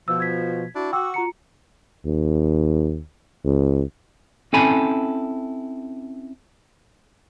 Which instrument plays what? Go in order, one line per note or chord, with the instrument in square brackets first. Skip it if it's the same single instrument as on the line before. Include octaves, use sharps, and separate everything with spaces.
[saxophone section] B2 F3 [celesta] E6
[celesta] G#6 B6
[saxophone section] D4 E4 F#4
[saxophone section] F#4 [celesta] G5 D6 E6
[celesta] F4 A#5 C#7
[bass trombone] D#2
C#2
[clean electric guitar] C4 C#4 E4 A4 G#5 B5